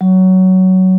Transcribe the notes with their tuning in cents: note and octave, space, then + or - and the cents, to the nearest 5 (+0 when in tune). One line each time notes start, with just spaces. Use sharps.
F#3 +15